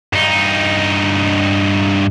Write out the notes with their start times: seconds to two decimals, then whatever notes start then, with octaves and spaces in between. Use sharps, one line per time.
0.13 G2 D#4